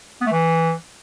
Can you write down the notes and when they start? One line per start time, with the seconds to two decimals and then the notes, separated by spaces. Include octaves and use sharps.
0.21 B3
0.27 A3
0.32 E3